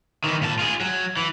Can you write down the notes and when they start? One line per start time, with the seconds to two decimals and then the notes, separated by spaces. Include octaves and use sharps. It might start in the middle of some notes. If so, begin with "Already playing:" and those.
0.24 D#3 E3
0.41 A#2 A5
0.59 F4 G#4
0.81 F#3
1.17 E3